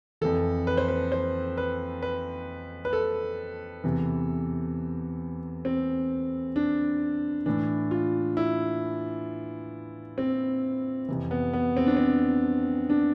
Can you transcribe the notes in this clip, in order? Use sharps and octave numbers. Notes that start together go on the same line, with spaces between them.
F2 E3 A4
B4
C5
B4
C5
B4
B4
B4
A4
E2 C3 E3
C4
D4
A2 E3 D4
F4
E4
C4
F2 C3 E3
B3
B3
C4
D4
C4
D4